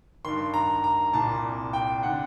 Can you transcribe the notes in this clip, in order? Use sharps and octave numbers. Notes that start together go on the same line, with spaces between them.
G2 D#3 C6
A#5
A#5
C2 A#2 A5
G5
D3 F#5